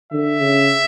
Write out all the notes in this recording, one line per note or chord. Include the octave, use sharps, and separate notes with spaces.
D3 E5
C#3